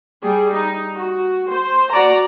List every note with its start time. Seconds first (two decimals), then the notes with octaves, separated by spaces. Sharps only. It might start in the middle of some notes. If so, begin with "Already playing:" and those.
0.22 G3 G#4
0.53 D#4
0.96 F#4
1.49 C5
1.91 F#4 D5 A#5